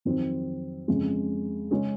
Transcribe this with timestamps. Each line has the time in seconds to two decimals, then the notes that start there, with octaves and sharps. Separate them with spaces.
0.05 F2 D#3 F#3 C4
0.88 F2 C#3 G#3
1.71 C#3 G#3 C#4 G#4